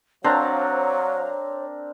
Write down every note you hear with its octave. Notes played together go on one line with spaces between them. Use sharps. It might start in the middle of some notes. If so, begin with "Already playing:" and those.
F#3 C4 D4 A#4 C5 C#5 F5 A#5